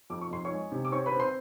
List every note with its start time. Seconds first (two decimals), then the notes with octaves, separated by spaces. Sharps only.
0.10 F2 D6
0.21 C#6
0.31 F2 C6
0.45 C#5 C#6
0.51 G#3
0.72 C3
0.85 D6
0.92 C4 C#5 C#6
1.06 B4 B5
1.13 C4
1.20 C5 C6